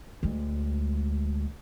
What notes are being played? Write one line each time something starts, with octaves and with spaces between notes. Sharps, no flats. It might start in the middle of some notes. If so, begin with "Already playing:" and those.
D2 G#3